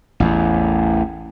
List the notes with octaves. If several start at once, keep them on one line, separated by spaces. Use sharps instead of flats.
A1 E2